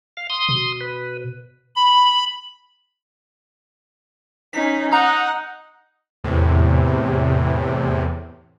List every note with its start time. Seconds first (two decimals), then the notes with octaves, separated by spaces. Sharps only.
0.17 F5
0.30 C6 D#6
0.49 B2
0.81 B4
1.75 B5
4.53 C#4 D#4 B6
4.92 D#4 F#5 A#5
6.24 E2 A2 C3